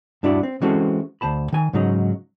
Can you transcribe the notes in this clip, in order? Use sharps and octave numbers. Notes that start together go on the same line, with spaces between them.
G2 D4 E4 F#4 D5
C4
E3 G#3 C4 C#4 F#4 A4
D2 C5 A5 B5
D#3 G#5
G#2 C#3 F#3 D#4